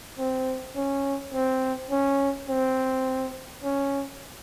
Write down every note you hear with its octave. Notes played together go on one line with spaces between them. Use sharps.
C4
C#4
C4
C#4
C4
C#4